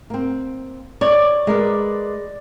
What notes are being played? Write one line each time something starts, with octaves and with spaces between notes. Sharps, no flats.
A#3 C4
C#5 D5
G#3 A#4 B4